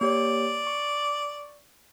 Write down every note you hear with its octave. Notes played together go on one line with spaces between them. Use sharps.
A#3 G4 C#5 D5
C#6